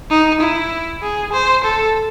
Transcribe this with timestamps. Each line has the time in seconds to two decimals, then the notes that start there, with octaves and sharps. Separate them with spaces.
0.11 D#4
0.41 E4
1.03 G#4
1.33 C5
1.64 A4